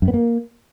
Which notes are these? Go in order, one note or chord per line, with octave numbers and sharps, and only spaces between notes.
F#2
B3
A#3